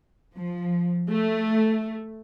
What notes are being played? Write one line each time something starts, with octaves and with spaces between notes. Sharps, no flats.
F3
A3